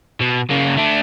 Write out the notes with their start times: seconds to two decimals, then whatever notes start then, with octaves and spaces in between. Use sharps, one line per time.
0.21 B2
0.51 C#3 A#3
0.77 A3 D4